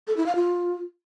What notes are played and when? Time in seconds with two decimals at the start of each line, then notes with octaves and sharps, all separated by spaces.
0.07 A4
0.17 E4
0.26 F5
0.35 F4